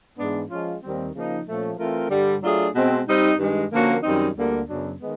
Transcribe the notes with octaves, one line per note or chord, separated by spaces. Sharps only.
G#2 E3 G#3 B3 D4
F3 G#3 C#4 F4
D#2 D#3 G3 C4
C#3 F3 A#3 D#4
A#2 F3 A3 C#4
E3 A3 C4 F4 A#4
G2 D3 G3
F#3 A3 D4 F4 G#4
B2 G#3 C4
G3 C4 D#4
G2 D#3 G#3
D3 F3 A#3 C#4 F#4
F#2 D#3 G3 C4 D#4
D2 D3 G3 A#3
F#2 C#3 F#3 B3 D4
D#3 G#3 B3